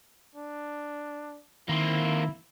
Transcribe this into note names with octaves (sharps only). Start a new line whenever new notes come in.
D4
D#3 A#3 C4 E4